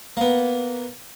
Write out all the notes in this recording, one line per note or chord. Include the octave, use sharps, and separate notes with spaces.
A#3 B3